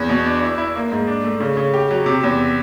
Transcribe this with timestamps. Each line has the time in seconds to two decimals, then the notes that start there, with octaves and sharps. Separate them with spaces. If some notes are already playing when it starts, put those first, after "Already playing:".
Already playing: E2
0.09 B2
0.25 D4
0.42 E4
0.58 E4
0.76 A#3
0.92 G#2
1.07 D4
1.24 A3
1.40 C#3
1.57 C#3
1.74 G4
1.91 F#3
2.06 C3
2.23 E2